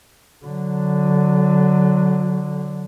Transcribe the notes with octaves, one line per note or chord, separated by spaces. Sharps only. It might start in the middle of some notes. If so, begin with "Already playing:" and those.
D3 F#3